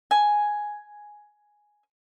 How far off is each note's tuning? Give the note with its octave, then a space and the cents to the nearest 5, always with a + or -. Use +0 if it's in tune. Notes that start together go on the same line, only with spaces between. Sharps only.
G#5 +5